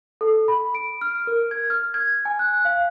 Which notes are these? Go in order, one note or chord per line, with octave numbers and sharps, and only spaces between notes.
A4
B5
D7
F6
A#4
G#6
F6
G#6
G#5
F#6
F5